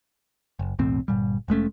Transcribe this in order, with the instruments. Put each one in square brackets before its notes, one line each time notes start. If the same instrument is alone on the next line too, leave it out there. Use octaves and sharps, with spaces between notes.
[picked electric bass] F#1
B1 E2 A2 C4
G1 A#2 G3
F1 G#3 A3 C#4